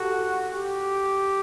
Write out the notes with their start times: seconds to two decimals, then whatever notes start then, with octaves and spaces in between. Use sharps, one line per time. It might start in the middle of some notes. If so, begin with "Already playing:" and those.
Already playing: F#4 G4 A4
0.52 G4